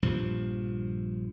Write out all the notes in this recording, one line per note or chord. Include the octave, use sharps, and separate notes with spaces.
A#1 G2 F3